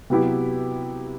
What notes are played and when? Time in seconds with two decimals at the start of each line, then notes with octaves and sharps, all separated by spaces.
0.10 C3 F#3 B3 E4 G4